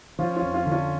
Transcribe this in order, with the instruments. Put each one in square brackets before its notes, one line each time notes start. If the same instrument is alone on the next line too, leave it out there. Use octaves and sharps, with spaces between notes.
[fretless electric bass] F3 [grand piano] C#4 F4
[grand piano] C#4 F4
[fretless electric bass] F2
[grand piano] C#4 F4
[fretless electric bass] D3
[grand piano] C#4 F4